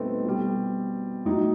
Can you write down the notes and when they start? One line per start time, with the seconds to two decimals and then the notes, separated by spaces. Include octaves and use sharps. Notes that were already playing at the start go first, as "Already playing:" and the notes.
Already playing: B2 G3 A3 B3 C4 D#4
0.25 B2 G3
1.25 A2 F#3 D#4